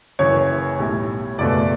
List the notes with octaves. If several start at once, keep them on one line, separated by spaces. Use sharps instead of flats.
F#1 F#2 E3 C#5
B1 A2 G3
F#1 E2 B2 A3 D5